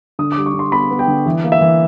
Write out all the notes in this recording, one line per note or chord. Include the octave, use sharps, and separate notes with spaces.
D3 D#6
G3 D6
C#6
D3
C6
B3 B5
B3
G5
D3
E3
A#3
E5
E3